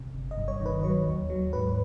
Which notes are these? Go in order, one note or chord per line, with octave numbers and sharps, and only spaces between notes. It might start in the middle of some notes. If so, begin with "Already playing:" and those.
Already playing: C3
G1
D#5
G2
C#5
D#3
B4
F#3 C#5
D#2
F#3
G#2 B4